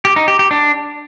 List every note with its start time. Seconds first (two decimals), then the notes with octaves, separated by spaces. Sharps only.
0.05 G4
0.16 D#4
0.28 G4
0.39 G4
0.51 D4